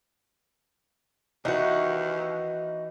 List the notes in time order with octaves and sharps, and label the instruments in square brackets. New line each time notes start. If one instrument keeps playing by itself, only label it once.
[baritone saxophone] D#2 [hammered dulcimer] E3 [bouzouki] D#4 F#4